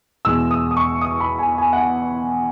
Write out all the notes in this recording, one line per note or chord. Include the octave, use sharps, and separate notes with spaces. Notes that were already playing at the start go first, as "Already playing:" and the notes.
E2 B2 G#3 E6
D#6
D#6
C#6
D#6
B5
G#5
G#5
F#5
G#5